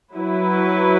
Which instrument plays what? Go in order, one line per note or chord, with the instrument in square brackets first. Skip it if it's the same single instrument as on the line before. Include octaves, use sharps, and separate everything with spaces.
[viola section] F#3 E4 B4